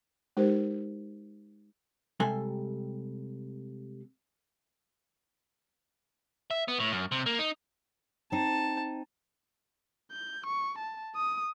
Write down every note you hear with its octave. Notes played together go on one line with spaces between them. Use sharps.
G#3 D#4 G4 A#4 C5
C3 G3 G#3 A4 G#5 C6
E5
B3
A2
F#2
C3
A#3
D#4
C4 D#4 A5
G6
C#6
A5
D#6